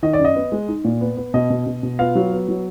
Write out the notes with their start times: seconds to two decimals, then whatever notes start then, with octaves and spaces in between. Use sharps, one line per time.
0.03 D#3 D#5
0.13 D5
0.19 F#2
0.25 D#5
0.35 B3
0.52 G#3
0.68 D#4
0.85 A#2
1.01 B3
1.17 B3
1.34 B2 D#5
1.50 B2
1.67 B2
1.83 B2
1.99 B3 F4 F5
2.15 F#3
2.32 B3
2.49 F#3